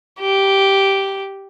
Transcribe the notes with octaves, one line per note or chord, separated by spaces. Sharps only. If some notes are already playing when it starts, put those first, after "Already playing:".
G4